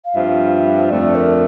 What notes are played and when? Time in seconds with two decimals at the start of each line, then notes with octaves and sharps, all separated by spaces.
0.05 F5
0.15 G2 F3 C4 F4 E5
0.90 F2 D3 A3 D5
1.15 A#4